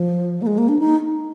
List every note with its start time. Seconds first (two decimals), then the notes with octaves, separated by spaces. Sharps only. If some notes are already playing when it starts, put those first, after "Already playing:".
Already playing: F3
0.42 A#3
0.47 G#3
0.58 A#3
0.69 D4
0.79 D#4